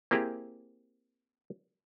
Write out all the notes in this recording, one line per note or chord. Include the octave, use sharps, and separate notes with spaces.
A#3 C4 E4 G4 G#4